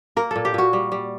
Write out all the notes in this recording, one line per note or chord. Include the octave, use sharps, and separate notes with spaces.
A#3 A#4
A#2 A4
G4
A#2 F#4
G3
G3